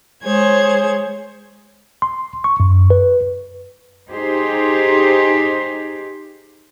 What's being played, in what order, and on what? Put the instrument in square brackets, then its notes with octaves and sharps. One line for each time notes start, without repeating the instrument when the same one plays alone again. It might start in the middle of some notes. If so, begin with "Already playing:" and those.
[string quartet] G#3 G#4 C5 C#5 G#6
[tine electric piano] C6
C#6
F#2
B4
[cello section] D#4 G4 G#4 C5